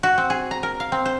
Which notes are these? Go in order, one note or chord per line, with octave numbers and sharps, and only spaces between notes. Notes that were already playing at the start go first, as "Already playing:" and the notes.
F#4
C4
G#4
A#5
A#4
F5
C4
C5